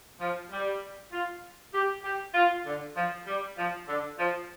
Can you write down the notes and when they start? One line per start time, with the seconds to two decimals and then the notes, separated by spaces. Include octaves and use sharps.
0.20 F3
0.51 G3
1.11 F4
1.73 G4
2.04 G4
2.34 F4
2.65 D3
2.95 F3
3.26 G3
3.57 F3
3.87 D3
4.18 F3